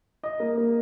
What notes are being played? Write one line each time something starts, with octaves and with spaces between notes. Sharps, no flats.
D#5
A#3
A#3